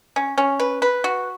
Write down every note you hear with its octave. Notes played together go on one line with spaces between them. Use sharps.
C#4
C#4
B4
B4
F#4